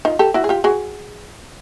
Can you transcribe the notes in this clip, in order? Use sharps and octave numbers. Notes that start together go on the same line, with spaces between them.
D#4 F4
G4 A4
E4 F#4
G#4
F4 G4
F#4 G#4